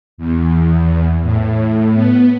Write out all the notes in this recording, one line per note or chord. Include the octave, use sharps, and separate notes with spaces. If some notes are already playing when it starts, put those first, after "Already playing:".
E2
A2
B3